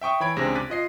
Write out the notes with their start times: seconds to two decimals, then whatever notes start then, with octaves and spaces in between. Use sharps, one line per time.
0.01 E5 G5 C#6 D#6
0.20 E3 C#5 B5 G#6 D7
0.36 C#2 C3 D4 G#4 C5 A#6
0.55 D6 F#6 A6 B6 D#7
0.70 F4 D#5 C7